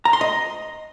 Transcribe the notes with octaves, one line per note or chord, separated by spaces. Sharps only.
A#5
C6
D#5